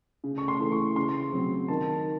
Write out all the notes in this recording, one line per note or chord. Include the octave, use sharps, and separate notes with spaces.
C#3
C#6
C6
E3 A3
C#6
C#3 C6
F#3 C4
D#3 A5